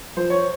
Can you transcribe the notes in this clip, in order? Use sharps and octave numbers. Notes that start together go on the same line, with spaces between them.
F3 C5
C#5